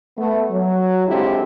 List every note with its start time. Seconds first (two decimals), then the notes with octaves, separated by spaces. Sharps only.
0.17 A3 B3
0.50 F#3
1.07 D3 G#3 C4 E4 F4 G4